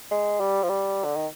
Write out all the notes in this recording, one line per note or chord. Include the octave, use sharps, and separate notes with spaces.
G#3
G3
F3
G3
D3
D#3